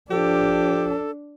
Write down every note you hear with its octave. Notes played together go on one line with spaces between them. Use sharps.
F3 D4 G4 A4